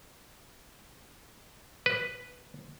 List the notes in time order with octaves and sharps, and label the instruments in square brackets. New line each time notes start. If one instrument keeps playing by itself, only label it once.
[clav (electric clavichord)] B4